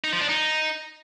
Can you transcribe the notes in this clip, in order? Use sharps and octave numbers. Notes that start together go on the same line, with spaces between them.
D#4
F3
D4
D#4